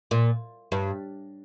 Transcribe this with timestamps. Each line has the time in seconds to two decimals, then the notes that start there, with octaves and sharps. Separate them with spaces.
0.11 A#2
0.72 G2